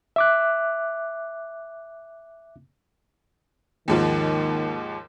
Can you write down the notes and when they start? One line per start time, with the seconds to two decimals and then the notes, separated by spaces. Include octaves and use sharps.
0.16 E5 D6 F#6
3.88 D#2 G#2 D#3 F3